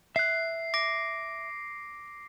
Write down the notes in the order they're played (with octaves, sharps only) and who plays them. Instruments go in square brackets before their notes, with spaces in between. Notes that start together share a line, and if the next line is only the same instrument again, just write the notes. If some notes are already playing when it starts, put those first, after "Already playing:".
[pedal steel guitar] E5 F#6 [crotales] C7
[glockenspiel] D6 A#6 D7